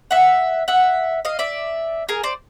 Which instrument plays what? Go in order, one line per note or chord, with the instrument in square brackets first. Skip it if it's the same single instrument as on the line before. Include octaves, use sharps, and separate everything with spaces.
[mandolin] E5 F#5
E5 F#5
D#5 F5
D5 E5
G#4 A#4
C5 D5